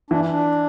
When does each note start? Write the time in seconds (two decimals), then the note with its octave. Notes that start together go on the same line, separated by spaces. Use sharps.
0.10 E3 D4
0.31 D4